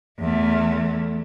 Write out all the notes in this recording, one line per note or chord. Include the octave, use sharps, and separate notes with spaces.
E2 A3